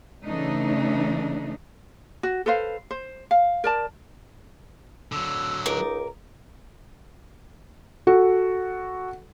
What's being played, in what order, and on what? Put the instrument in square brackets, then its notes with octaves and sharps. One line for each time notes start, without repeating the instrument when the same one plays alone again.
[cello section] C#3 E3 A3 D4 D#4
[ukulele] F#4
A4 B4 C5 F5
C5
F5
A#4 D5 A5
[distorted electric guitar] D3 F#3 [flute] E6
[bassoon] C#2 [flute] D#4 [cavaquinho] A#4 D6
[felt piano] F#4 A4